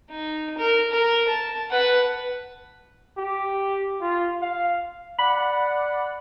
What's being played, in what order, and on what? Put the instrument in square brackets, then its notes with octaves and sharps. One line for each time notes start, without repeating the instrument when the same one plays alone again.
[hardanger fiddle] D#4
A#4
A#4
A5
B4 F#5
[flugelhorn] G4
F4
F5
[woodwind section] D5 F#5 [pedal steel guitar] B5